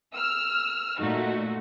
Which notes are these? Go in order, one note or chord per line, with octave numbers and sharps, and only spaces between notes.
E6 F6
A#2 A3 D#4 F#4